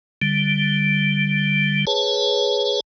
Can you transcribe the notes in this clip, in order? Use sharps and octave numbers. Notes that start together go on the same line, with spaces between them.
D3 G3
G#4 B4 C#5 A5